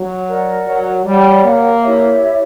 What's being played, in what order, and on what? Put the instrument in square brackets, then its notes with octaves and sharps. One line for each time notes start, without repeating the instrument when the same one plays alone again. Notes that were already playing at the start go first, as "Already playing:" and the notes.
Already playing: [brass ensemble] F#3
[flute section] A#4 D5 F#5
[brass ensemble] F#3
[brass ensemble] G3 [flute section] G4 C#5 F#5
[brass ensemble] A#3
[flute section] E4 G4 C#5 E5